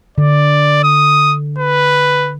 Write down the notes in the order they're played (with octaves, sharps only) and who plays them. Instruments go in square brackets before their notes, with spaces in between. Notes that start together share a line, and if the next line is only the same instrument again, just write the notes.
[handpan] D3 [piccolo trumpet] D5
[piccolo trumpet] D#6
B4